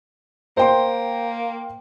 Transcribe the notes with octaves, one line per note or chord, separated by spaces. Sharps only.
A#3 C5 G5 C6